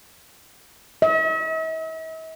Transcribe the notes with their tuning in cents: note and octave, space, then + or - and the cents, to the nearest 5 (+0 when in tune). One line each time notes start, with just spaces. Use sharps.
E5 -45